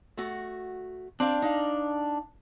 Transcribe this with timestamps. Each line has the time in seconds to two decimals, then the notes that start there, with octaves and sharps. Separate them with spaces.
0.17 A3 F#4
1.20 C4 D4 F5
1.42 D#4 F5